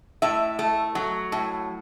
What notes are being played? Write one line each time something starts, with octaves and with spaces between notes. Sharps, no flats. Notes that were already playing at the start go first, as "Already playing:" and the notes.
A2 E5
A3
F#3
A2